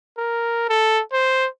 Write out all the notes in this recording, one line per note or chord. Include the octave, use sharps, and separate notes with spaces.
A#4
A4
C5